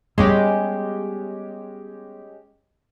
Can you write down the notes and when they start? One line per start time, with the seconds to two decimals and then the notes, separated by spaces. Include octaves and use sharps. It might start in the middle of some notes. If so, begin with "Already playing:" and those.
0.18 G3 G#3 B3 C#4 G4